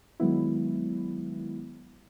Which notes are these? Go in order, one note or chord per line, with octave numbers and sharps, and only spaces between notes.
D#3 F#3 G#3 B3 E4